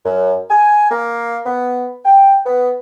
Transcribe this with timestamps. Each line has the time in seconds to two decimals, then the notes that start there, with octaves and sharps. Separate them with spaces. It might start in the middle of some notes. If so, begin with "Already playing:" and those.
0.04 F#2
0.50 G#5
0.90 A#3
1.46 B3
2.05 G5
2.45 B3